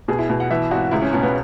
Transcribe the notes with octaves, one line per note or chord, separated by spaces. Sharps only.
B2 G#4
E4
B2
F#5
E3 E5
G#1 F#4
C#2 E4
C#4
B2 C#4
B3